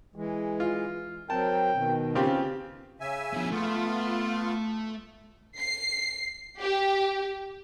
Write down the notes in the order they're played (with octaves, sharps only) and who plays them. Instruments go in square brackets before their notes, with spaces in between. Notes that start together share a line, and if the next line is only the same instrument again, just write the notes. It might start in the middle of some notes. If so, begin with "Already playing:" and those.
[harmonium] E3 G#3
[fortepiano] F4
[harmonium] F#3 C4 A#4 [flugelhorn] G5 [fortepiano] A5
[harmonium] B2 D#3
[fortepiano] C#3 C4 G4 [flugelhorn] F4
[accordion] C#3 E5 G#5
[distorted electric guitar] B2 F3
[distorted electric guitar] A3 [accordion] B3 F4
[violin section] C7
G4